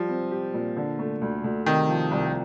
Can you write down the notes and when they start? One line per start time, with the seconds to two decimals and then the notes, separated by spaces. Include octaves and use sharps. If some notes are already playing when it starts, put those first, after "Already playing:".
Already playing: F3 G3
0.09 C4
0.31 G4
0.54 A#2
0.77 D3
0.99 A3
1.22 D2
1.44 D2
1.66 C3 D#3
1.89 F3
2.11 C2